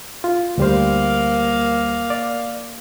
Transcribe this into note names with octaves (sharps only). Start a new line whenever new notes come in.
F4
D2 G3 A#3 C5 F5
D5